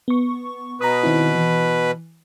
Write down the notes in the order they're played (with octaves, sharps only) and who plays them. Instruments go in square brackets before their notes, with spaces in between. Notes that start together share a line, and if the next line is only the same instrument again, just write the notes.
[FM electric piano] B3 C#6
[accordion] B2 B4 [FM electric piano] A#5 B5 D#6
[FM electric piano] D#3 C4 E4
E3